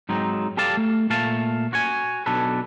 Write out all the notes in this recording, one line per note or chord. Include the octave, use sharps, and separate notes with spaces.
G#2 F#3 C4 D#4
G4 A4 D5 F5 A5
A3
A#2 A3 F5 A5
F#4 C#5 G#5
B1 B2 D4 A4 B4